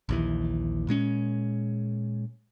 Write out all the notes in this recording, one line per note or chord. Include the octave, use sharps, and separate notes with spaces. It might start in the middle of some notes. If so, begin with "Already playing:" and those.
A#1 D#2 E3
A#2 G#3 C#4